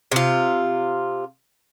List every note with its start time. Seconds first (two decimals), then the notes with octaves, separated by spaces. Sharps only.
0.12 C3 F4